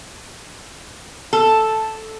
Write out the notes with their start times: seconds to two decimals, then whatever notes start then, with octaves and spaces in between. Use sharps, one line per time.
1.33 A4